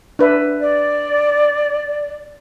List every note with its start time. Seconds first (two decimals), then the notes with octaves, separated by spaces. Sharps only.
0.19 D4 B4 E5
0.61 D5